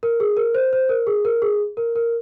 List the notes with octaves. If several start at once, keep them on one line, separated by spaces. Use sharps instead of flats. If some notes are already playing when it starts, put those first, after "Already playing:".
A#4
G#4
A#4
C5
C5
A#4
G#4
A#4
G#4
A#4
A#4